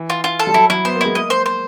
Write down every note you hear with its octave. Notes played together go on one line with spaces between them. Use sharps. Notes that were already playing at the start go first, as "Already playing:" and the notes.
Already playing: E3
F4
F4
A4
G3
F#3 E4
F#3 E4
B3 C5
A#3
G#3 E4
A#3 D#5
C5
C5